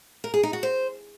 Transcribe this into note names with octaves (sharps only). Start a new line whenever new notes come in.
A#4
G#4
D#4
F#4
C5